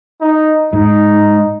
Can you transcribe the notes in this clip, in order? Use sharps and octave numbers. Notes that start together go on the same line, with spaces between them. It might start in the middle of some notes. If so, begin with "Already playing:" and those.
D#4
G#2 D#4